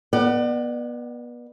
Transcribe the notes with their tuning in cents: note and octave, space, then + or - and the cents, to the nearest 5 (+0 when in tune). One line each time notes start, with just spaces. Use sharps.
B3 -30 D5 +35 F#5 +30